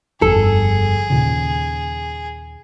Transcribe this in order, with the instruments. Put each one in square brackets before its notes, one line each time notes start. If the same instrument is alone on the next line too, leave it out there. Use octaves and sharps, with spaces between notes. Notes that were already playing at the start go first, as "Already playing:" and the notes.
[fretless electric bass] G1 F2 [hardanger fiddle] G#4 [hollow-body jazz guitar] A4
[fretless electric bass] D#2 A#2 C#3